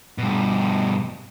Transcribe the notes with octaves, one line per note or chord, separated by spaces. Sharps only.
G2 B2